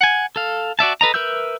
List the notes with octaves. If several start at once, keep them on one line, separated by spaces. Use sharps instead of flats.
F#5 G#5
A4 F5
F#4 D5 E5 A5
A4 B4 D#5 A#5
A#4 B4 E5 E6 G6